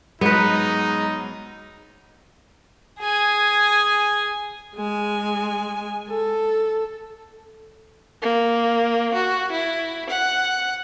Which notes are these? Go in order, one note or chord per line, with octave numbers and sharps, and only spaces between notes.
G#2 F#3 G#3 B3 D#4 B4
G#4 G#5
G#3 G#5
A4
A#3
F#4
E4
F#5